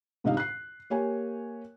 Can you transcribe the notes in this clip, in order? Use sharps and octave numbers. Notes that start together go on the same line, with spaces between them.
D2 G#2 C3 D#4 D#5 F5
F#6 C7
A#3 G4 C#5 G#5